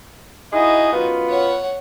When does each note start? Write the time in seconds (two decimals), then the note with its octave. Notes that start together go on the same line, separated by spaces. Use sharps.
0.53 D#4 E4 F#4 G#4 D#5
0.92 F#2 B3 F4
1.29 C#5 F#5